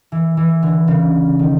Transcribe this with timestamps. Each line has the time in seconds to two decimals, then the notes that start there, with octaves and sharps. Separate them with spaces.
0.12 E3
0.37 E3
0.62 D3
0.88 C#3
1.39 D#3